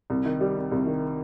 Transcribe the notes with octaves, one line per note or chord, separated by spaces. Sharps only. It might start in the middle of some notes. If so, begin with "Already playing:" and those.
C2
D#3
G3
C3
C2
D#3